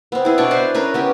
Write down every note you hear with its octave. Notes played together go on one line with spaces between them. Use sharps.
B3 C4
E4 G#4
B2 D4 D5 C#6
B4 C5 C6
C#4 A#4 B4
B3 C#4 G4